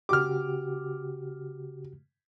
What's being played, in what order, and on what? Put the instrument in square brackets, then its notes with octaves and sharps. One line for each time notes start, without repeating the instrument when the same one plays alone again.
[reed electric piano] C#3 F#4 G4 [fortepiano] D6 F6